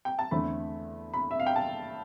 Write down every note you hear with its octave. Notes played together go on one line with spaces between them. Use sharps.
G5
A5
E2 D3 A3 C4 B5
B5
E5
F5
G5
A5